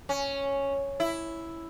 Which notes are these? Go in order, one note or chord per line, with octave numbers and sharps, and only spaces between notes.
C#4
E4